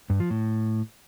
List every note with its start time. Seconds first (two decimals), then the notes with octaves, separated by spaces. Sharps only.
0.10 G2
0.20 F3
0.30 A2